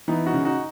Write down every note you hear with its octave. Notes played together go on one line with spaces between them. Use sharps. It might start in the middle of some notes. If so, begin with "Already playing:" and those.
E3 B3 D#4
D#4 F#4
C#3
D#4 F#4